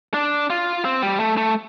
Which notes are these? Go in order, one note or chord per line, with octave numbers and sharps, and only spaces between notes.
D4
F4
C4
G3
A3
A3